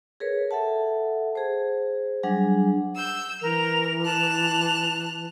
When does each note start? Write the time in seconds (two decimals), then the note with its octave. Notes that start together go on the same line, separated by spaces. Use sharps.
0.20 G#4 A#4 B4 C#5
0.51 A4 E5 F#5 A5
1.35 G#4 C5
2.23 F#3 G3 D4 G#4 F#5 G#5
2.96 E6 G6
3.42 E3 A#4 F7
4.05 A5 F#6 F7